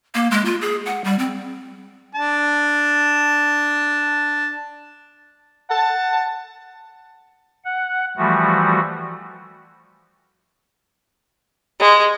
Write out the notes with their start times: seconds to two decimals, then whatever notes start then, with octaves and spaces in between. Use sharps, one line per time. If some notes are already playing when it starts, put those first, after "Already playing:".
0.15 A#3
0.31 G#3
0.45 F4
0.61 G#4
0.86 F#5
1.04 G3
1.19 C4
2.15 D4 A5
5.70 F#5 A5
7.65 F#5
8.17 E3 F3 G3 A3 F#4
11.79 G#3